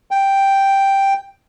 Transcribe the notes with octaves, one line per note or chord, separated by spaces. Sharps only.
G5